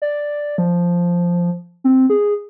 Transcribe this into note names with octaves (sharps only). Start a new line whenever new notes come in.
D5
F3
C4
G#4